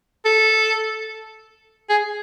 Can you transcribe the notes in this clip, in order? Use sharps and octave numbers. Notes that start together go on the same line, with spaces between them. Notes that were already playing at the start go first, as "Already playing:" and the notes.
A4
G#4